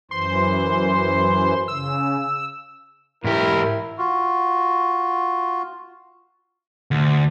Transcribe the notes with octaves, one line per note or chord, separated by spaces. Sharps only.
F#2 E3 C5 C6
C#3 E6
G#2 E3 E4 G4 A#4
F4 F#4
D2